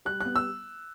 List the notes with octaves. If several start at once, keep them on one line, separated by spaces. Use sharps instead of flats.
G3 F#6
B3 F#6
E6